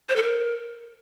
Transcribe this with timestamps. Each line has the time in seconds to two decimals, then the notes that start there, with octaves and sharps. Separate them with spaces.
0.09 C5
0.16 A4
0.23 A#4